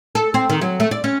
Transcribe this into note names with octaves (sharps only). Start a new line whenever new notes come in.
A4
C4
D#3
F#3
A3
D5
C#4